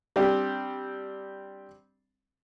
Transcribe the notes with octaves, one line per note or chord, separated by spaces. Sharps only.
G3 C4 D4 G4